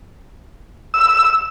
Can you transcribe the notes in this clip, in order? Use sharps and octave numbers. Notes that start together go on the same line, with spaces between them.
E6